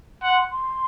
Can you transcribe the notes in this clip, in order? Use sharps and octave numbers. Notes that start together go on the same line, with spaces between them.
F#5 C6
C6